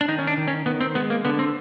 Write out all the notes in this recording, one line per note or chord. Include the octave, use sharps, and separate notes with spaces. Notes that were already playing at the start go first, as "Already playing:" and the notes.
D4
D#3 D#4
C#4
D4
D#3
C#4
D#3 B3
C4
G#3 B3
A#3
D3 B3
C4